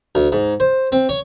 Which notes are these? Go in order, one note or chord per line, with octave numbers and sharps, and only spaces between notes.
D2
G#2
C5
C4
C#5